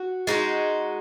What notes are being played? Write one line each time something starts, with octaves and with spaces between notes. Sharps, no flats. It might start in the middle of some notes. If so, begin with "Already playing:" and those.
Already playing: F#4
G#3 D#4 F#4